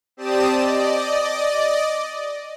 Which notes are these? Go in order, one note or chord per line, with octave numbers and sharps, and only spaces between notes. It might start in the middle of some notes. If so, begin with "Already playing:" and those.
C4 G4 D5 A5 D#6 E7
D5 D#5